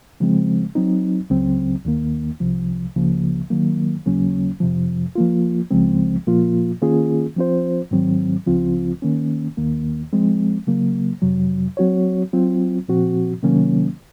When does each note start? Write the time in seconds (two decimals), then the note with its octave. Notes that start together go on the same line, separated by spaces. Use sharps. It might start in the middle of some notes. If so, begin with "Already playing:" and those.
0.20 C#3 F3 G#3 C4
0.75 F#3 C4 D#4
1.30 C#2 C#3 F#3 C4
1.85 D#2 D#3 A#3
2.40 C2 C3 F3
2.96 C#2 C#3 F3 A#3
3.50 D#3 F#3 A#3
4.06 D#2 C#3 F#3 A#3 C#4
4.60 F2 C3 F3
5.15 F3 A#3 F4
5.71 C#2 C#3 F3 G#3 C4
6.27 A#2 F3 A#3 F4
6.82 D#3 A#3 C#4 F4 G#4
7.36 F3 C4 F4 C5
7.91 G#2 D#3 F#3 C4
8.46 C#2 C#3 F3 C4 F4
9.02 D#3 A#3 C#4
9.57 D#2 D#3 A#3
10.13 F3 G#3 C4
10.67 C#3 F#3 A#3
11.22 F2 C3 F#3
11.77 F#3 C4 F#4 C#5
12.33 F#3 C4 F4
12.88 A#2 F3 C4 F#4
13.43 C3 D#3 F#3 A#3 C#4